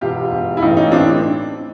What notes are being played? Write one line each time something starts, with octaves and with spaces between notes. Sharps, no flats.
E1 E2 B2 F4 G4
E1 E2 B2
E4
A1 A2 E3 D#4 F4
C#4 D#4
A1 A2 E3 C4 D4